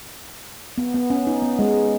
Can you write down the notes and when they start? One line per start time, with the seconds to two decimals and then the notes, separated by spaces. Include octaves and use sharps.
0.78 B3
0.94 B3
1.10 C#4
1.27 D#4
1.42 B3
1.59 G#3